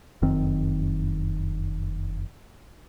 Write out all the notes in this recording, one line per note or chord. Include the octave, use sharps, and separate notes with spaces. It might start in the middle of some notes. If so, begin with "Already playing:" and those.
F1 F#2 D#3 C4